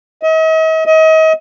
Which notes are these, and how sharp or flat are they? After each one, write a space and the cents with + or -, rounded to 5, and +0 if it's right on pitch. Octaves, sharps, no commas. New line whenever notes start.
D#5 +45
D#5 +35